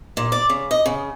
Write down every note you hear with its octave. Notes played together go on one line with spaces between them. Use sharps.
A#2
D5
C#3
D#5
C#3